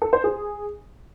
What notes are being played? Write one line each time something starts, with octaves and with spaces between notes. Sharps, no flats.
A4
C5
G#4